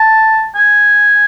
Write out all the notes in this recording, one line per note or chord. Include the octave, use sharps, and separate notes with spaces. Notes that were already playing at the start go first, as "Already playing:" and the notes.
Already playing: A5
G#5